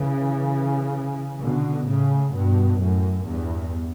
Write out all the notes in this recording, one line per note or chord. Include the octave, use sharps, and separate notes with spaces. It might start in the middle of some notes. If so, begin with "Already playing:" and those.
Already playing: C#3 E3
B2 D3
A2 C#3
G2 B2
F#2 A2
E2 G2